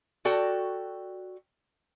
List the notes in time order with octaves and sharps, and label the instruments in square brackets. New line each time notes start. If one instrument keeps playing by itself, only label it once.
[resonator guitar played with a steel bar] F#4 A4 D5 G5